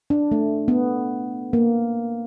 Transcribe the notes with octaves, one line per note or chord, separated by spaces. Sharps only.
D4
A3
B3
A#3